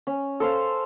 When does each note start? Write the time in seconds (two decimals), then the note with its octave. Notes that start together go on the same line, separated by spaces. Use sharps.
0.07 C#4
0.40 A4 C5 F5